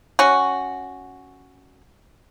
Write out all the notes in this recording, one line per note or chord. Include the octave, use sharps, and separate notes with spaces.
C#4 F#4